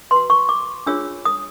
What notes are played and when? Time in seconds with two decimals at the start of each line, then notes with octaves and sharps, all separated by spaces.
0.11 F#4 B4 C6
0.30 C#6
0.49 D6
0.86 D4 F4 G#4 C#5 E6
1.25 D#6